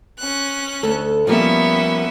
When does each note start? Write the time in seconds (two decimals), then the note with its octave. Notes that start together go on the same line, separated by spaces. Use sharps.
0.20 C#4 F#6
0.83 D2 A4
1.27 F3 G3 A#3 B3 C#4 E5